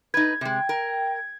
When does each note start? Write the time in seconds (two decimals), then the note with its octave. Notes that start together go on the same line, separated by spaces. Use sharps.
0.14 D#4 B4 G#6
0.41 C3 G#3 G5
0.69 A#4